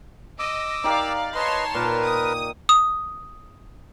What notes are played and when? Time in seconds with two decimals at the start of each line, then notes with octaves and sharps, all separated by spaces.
0.39 D#5 D6 E6
0.84 D#4 G4 A#4 D5 F5
1.35 B4 C#5 D#5 A5 C6
1.75 A#2 A#4 B4
2.03 D#6
2.69 D#6